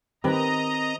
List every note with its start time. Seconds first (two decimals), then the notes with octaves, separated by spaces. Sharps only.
0.24 D#3 C4 G4 A#4 B4 D#5 A#5